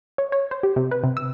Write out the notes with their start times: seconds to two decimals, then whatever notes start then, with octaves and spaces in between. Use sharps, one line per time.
0.18 C#5
0.32 C#5
0.51 C5
0.63 G4
0.76 C3
0.91 B4
1.04 C3
1.17 E6